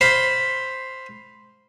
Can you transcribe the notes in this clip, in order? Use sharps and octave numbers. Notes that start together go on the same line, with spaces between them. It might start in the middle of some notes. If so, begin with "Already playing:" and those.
C5 F5 B5 C6